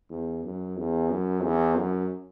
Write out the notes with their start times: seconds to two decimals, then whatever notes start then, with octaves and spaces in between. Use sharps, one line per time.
0.11 E2
0.44 F#2
0.77 E2
1.10 F#2
1.43 E2
1.77 F#2